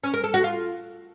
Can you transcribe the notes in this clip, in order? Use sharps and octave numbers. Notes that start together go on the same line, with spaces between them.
C#4
A#4
A4
F#4
F4